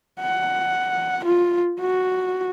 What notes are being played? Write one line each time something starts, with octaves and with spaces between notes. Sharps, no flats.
F#5
F4
F#4